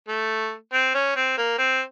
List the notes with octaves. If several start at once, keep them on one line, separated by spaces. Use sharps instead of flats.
A3
C4
C#4
C4
A#3
C4